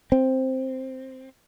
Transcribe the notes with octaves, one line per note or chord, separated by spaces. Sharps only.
C4